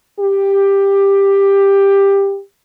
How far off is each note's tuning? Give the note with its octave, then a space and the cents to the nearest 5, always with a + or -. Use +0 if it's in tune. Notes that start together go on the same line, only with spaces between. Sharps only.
G4 +15